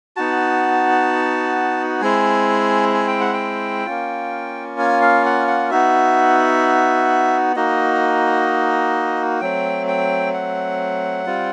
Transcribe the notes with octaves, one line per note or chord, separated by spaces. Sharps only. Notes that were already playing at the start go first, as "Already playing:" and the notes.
B3 D#4 F#4 A5
G#3 C4 E4 G#5
G#5
G5
F#5
G5
A#3 C#4 F4
G#5
F5
F#5
F#5
B3 D#4 F#4 E5
A#3 D#4 F#4 D#5
F#3 A3 C4 G5
G5
F#5
G3 C4 F4